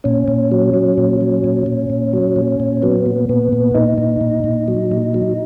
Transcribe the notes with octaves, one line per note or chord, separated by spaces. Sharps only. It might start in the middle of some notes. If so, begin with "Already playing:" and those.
A#2 C#4
A#2
F#3
F#3
A#2
F#3
A#2
A#2
A#2
F#3
A#2
A#2
F#3 B3
A#2
A#2 B3
A#2
A#2 D#4
A#2
A#2
A#2
F#3
A#2
F#3